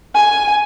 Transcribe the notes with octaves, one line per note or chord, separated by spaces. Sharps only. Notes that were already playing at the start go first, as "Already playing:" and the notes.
G#5